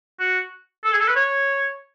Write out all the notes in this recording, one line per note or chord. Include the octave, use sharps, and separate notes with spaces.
F#4
A4
G#4
A4
B4
C#5